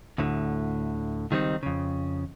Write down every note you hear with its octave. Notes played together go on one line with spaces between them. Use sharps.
D2 A2 D3
C#2 D#3 G3 C4 D#4
F2 C#3